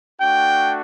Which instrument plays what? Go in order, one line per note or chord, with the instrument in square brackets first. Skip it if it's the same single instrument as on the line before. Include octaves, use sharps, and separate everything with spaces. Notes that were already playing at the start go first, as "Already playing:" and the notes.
[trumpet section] A3 D4 F#4 G5